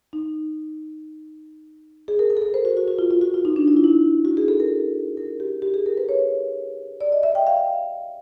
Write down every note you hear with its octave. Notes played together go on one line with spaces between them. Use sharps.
D#4
G#4
A#4
A#4
A4
A#4
C5
F#4
F#4
F#4
F4
F4
F#4
F4
D#4
D4
E4
F4
E4
F#4
G#4
A4
A#4
A#4
G4
G4
G#4
A#4
B4
C#5
D5
D#5
E5
G5
F5